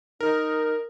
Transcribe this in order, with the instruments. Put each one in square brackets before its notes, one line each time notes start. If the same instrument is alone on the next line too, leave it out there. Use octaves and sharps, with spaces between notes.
[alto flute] D#4 [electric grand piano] A#4